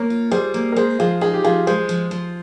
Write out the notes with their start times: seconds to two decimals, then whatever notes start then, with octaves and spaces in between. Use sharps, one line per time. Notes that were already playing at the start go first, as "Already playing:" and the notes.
Already playing: A#3 A#4 C#5
0.10 F4
0.32 G3 G#4 C5
0.54 A#3
0.72 A#4
0.76 G#3 G#4 C5
0.99 F3 F4 G#4
1.21 D#4 G#4
1.34 G4
1.44 F3 F4 G#4
1.67 G#3 G#4 C5
1.89 F3
2.11 F3